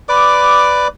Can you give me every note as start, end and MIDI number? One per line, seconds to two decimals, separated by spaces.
0.09 0.88 71
0.09 0.88 74
0.09 0.88 86